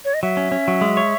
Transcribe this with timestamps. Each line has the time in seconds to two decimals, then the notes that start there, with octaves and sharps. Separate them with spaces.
0.05 C#5
0.14 D#5
0.23 F#3 E5
0.37 C#4
0.52 C#4
0.68 F#3
0.81 G#3
0.97 C#5